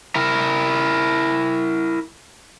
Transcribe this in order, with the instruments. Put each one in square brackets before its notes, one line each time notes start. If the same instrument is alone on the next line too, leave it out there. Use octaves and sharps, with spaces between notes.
[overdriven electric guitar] E4 A#4